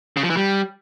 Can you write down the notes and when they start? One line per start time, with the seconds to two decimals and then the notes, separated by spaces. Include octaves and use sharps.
0.17 C#3
0.23 F3
0.30 E3
0.37 G3